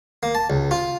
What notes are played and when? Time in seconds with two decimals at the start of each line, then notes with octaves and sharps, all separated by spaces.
0.23 A#3
0.35 A5
0.50 C#2
0.71 F4